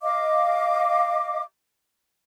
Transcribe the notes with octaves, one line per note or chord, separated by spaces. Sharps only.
D#5 F5 D6